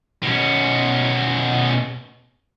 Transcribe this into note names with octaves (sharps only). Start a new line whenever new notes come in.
B2 C#4